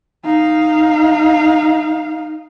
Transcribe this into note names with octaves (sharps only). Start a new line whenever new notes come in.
D#4 F5